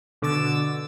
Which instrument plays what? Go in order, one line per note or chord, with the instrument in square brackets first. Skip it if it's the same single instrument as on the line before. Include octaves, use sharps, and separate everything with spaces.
[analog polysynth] B2 D3 D6 E6 A6